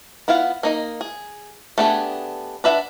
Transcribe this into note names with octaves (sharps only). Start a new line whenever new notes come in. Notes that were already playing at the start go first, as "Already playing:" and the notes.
B3 E4 F4 F5 F#5
A#3 D#4 D#5
G#4
A3 B3 D4 G4 G#4
D4 B4 E5 F#5